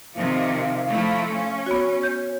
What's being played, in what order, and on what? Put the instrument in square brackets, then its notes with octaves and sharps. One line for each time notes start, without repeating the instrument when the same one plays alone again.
[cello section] C3 D#3 F3 [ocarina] F5
[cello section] F3 A3 E4
C#4
[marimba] B3 F#4 [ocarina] C#5
[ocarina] C#5 [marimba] G6